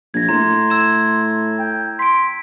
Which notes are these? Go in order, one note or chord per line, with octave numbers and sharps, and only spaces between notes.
A#1 G#6 A#6
A2 A#5 C6
E6 G#6 E7
G5
C6 B6 D7